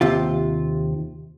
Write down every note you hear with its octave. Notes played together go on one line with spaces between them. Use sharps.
D#2 C3 F4